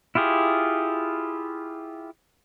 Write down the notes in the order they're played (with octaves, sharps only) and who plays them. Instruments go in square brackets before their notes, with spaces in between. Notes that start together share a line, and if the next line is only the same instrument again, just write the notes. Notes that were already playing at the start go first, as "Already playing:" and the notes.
[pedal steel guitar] E4 F4 G4 G#4